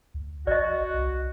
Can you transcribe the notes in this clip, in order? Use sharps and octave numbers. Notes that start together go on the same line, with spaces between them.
D2
A1 F#4 D5 D#5
C2